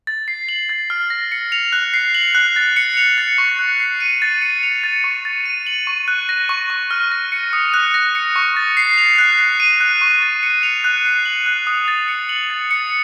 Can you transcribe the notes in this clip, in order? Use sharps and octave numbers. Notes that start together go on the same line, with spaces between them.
A6
C7
F#7
A6
F6
A#6
C#7
F7
F#6
C7
F#7
F#6
A6
C#7
F7
A6
C#6
F#6
C7
D#7
A6
C#7
F7
A6
C#6
A6
D#7
F#7
C#6
F#6
A#6
C#6
C#6
F6
A#6
C#7
D#6
F#6
A#6
C#7
C#6
A6
C7
F7
F#6
C7
D#7
F#6
C#6
A6
C#7
F7
F#6
C7
F#7
F#6
D#6
A6
C#7
F#7
A6
C#7